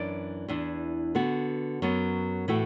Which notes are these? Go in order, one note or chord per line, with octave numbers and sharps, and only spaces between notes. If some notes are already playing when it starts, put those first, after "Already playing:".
Already playing: F#2 E3 D4 D5
E2 E3 D4
D3 B3 F#4
F#2 F#3 B3
A2 E3 A3 F#4